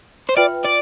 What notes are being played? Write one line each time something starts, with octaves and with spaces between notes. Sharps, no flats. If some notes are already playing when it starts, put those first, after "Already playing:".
C5
F4 B4 D5 E5 G5 B5
D5